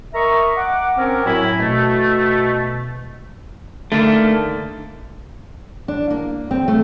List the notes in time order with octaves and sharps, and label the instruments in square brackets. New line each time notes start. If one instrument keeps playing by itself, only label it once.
[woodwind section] A#4 D#5 E5 A#5 C#6
F#5 D6
C4 C#4 A#4
F#2 A2 F#3 E4 G#5 B5
B2 A3
[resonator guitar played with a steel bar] D3 D#3 A#3 [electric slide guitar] A3
[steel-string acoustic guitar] D4
A#3
C4
A3